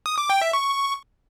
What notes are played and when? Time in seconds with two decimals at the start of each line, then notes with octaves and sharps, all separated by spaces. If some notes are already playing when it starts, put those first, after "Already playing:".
0.06 D#6
0.18 D6
0.30 G5
0.42 E5
0.53 C#6